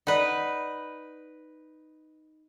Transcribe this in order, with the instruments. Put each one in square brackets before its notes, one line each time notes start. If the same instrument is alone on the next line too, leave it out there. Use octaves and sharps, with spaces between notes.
[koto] D#4 B4 [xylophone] D5 F#5